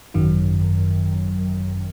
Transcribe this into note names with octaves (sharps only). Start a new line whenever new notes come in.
G#1 F#2 D#3 F#3